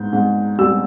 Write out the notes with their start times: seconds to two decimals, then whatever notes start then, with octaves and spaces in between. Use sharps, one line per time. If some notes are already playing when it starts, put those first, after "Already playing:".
Already playing: G#2 G6
0.13 G#2
0.59 G3 E6